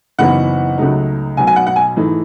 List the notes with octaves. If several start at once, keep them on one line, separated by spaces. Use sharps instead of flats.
F#1 F#2 E3 B3 D#4 F#5
C#2 C#3 F#3 A3 D#4
B1 B2 F#3 G#5
G#5
F#5
F#5
G#5
G#2 E3 A3 D#4